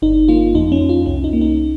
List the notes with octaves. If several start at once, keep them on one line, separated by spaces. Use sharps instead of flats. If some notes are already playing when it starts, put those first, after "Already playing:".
G1 D#4
A#3 F4
F2 D#4
C#4
F2
F4
C2 C#4
D#4
A#3
D#4